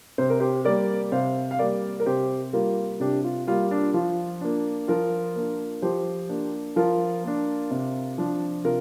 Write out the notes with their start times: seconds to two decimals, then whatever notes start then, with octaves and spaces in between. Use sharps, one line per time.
0.18 C3 C5
0.30 A#4
0.40 G4 C5
0.65 G3 A#3 A#4 D5
1.12 C3 C5 F5
1.51 F5
1.59 G3 A#3 A#4 D5
2.00 A#4
2.06 C3 G4 C5
2.53 G3 A#3 F4 A#4
3.00 C3 D4 G4
3.24 F4
3.47 G3 A#3 F4
3.71 D4
3.94 F3 F4
4.41 A#3 D4
4.88 F3 F4 A#4
5.36 A#3 D4
5.82 F3 G4 C5
6.29 A#3 D4
6.76 F3 F4 A#4
7.24 A#3 D4
7.71 C3
8.18 F3 D4
8.64 C3 F4 A#4